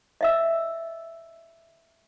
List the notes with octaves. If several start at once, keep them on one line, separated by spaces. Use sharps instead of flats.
D#5 E5 E6